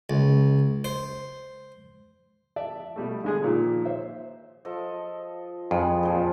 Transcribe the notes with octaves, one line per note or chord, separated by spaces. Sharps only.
C#2
C5
D5 E5 A5
B2 G3 A3
D3 G#3 G#4
A#2 D#3 F3
C5 C#5 E5
F3 A4 D#5
F2 G#4 B4
A#2 F3 F4